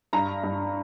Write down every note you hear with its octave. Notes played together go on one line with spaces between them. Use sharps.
G2 A#5
G2